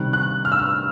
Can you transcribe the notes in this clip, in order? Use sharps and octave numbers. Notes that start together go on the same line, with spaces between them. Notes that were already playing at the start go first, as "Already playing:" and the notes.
Already playing: C3 D#3 G3 F#6
F#6
F6
E6
F6